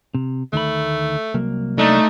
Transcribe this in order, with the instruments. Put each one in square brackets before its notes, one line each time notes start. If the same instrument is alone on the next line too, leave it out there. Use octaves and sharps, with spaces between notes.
[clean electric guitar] C3
[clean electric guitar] D2 D#3 B5 [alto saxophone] A3
[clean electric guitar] C2 F#3 A#3
[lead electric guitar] A3 [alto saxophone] D4 [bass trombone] D#4